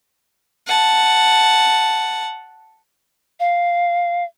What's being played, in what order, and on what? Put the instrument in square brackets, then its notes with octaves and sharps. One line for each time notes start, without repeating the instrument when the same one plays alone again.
[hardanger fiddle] F#5 A5
[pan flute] F5